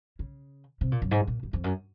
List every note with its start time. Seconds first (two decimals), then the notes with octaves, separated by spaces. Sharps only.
0.19 C#3
0.81 C3
0.92 A#2
1.02 F#2
1.11 G#2
1.27 A#2
1.43 F#2
1.53 F2
1.64 F#2